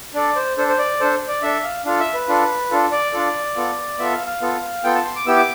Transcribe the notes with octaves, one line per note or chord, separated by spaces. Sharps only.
D4 A4 D5
C5
D4 A4 C5
C5
D5
D4 A4 C5
D5
D4 A4 E5
F5
D4 F4 A4 F5
E5
B4
D4 F4 A4
D4 F4 A4
D5
D4 F4 A4
B3 F4 A4
B3 F4 A4 E5
F5
F5
B3 F4 A4
B3 F4 A4 G5
A5
C6
D6
B3 E4 G4 E6
D6